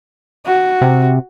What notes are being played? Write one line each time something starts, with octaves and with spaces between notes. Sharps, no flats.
F#4
C3